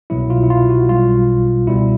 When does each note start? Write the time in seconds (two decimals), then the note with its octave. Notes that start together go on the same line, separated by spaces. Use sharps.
0.10 C2 B2 F#3 E4
0.30 F4
0.43 E4
0.50 F4
0.69 F#4
0.88 B1 B2 G3 F4
1.67 C#2 B2 G3 E4